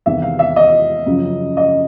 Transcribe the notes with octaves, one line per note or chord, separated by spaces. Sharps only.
E2 C3 D#3 E5
F5
E5
D#5
F#2 C#3 F3
D#5